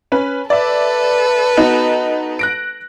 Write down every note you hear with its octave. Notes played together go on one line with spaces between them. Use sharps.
C#4 B4
A4 B4 D5 E5
B3 D#4 F#4
F#6 A#6 D7